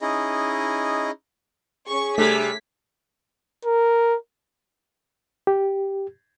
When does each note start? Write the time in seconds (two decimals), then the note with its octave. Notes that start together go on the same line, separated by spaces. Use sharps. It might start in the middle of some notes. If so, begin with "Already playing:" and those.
0.01 C#4 D#4 E4 G#4 D#5
1.88 C#4 G#4 C#6
2.18 C3 G3 A3 D4 G#6 B6
3.65 A#4
5.47 G4